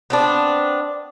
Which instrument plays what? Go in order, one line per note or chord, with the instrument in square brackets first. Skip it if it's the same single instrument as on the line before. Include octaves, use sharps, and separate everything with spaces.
[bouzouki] B3 C4 D4